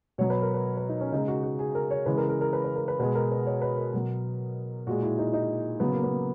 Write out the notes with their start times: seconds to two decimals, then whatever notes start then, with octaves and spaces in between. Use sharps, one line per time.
0.18 B2 F#3 C#5
0.30 B4
0.42 A#4
0.54 B4
0.77 B4
0.89 D#4
1.01 C#4
1.12 C#3 G#3 D#4
1.28 F#4
1.43 F#4
1.59 G#4
1.75 A#4
1.91 C#5
2.06 C#3 E3 G#3 B4
2.17 A#4
2.29 A#4
2.41 A#4
2.53 B4
2.64 B4
2.76 A#4
2.88 B4
2.99 B2 G#3 B4
3.15 A#4
3.31 B4
3.46 C#5
3.62 B4
3.77 A#4
3.93 B2 F#3
4.87 A#2 G#3 F#4
5.02 E4
5.18 D#4
5.33 D#4
5.80 C#3 F#3 B3
5.92 A#3
6.04 B3